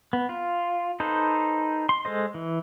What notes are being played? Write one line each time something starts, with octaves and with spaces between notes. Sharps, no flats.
B3
F4
D#4 A4 B4 C5
C6
G#3 A4 C5 D#5
E3